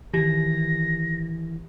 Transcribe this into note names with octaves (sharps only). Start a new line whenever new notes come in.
D#3 E3 G4 A#6